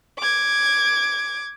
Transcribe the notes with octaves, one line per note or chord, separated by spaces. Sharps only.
D6 G#6